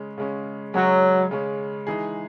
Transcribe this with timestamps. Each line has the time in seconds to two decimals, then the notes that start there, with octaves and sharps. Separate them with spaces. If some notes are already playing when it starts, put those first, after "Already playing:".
Already playing: C#3 G#3 C#4
0.18 C#3 G#3 C#4
0.74 C#3 F#3 G#3 C#4
1.31 C#3 G#3 C#4
1.87 E3 G#3 D#4 G#4